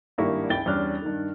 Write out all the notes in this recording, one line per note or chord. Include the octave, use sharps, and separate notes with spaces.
G#1 G2 A#3 E4 G4 C#6
C#2 E4 G5 A6 G7
E2 G3 C#4 D4 F6 F#6
G2 D#3